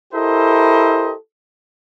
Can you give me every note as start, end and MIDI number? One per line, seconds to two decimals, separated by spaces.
0.14 1.13 64
0.14 1.13 67
0.14 1.13 69
0.14 1.13 70
0.14 1.13 72
0.14 1.13 75